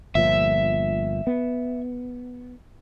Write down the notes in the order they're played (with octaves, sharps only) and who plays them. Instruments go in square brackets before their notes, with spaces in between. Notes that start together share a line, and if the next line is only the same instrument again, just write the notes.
[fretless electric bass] G1 A#2 F3 [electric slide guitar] E5
[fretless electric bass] B3